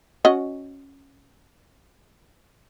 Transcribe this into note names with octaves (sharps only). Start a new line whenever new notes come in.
C#4 F#4 D#5